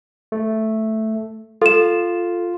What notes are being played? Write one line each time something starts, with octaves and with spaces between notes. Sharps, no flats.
A3
F4 A4 E7